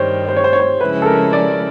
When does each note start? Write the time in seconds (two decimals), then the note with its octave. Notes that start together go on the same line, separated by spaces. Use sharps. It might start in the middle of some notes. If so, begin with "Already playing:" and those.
Already playing: G2 D#3 G3 C5 C#5
0.29 C5
0.36 C#5
0.44 C5
0.53 C#5
0.60 C5
0.80 C#3 F3 G#3 C#4 E4 B4
1.02 A4
1.06 A#4
1.33 D5